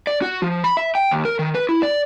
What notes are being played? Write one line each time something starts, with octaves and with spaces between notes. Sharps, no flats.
D5
F#4
F3
B5
E5
G5
D#2
A#4
D#3
B4
E4
D5